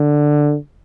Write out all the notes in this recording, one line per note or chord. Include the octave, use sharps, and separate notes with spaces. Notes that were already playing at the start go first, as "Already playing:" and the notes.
Already playing: D3